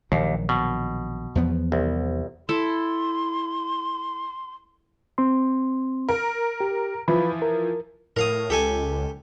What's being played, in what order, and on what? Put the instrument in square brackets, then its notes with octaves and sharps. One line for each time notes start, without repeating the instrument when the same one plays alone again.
[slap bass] A#1 D#3 F#3 [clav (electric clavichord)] D#2
[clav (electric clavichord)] B2
[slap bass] E2 F3 B3
[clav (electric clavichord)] C2
[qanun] E4 A4 [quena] C6
[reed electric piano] C4 C6
[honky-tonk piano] A#4
[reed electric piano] G4
[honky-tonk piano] E3 F3 [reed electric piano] F4 B4 B5
[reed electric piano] A#4
[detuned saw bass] A2 [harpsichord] A#4 F5 D#6
[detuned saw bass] C#2 [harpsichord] G4 A4 G#5